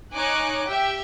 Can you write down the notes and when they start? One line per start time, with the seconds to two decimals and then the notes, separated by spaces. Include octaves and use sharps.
0.15 D#4 C#5 G#5 D6 F#6
0.69 G4 E5 G5